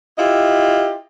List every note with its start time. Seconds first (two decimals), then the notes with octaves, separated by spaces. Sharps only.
0.18 E4 F4 G4 D#5